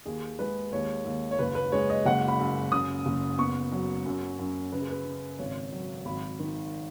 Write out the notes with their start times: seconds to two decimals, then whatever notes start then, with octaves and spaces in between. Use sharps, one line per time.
0.06 D#2 G#4
0.39 G#3 B4
0.72 D#2 C#5
1.05 D#2
1.31 C#5
1.39 F#1 B4
1.55 B4
1.72 G#3 C#5
1.90 D#5
2.06 F#1 F#5
2.28 B5
2.39 F#2
2.72 C#3 D#6
3.06 F#1
3.38 B3 C#6
3.72 F#3
4.06 F#2
4.39 F#2
4.72 C#3 B4
4.81 G#4
4.89 B4
5.05 C#3
5.39 G#1 C#5
5.72 F#3
6.05 G#1 B5
6.39 D#3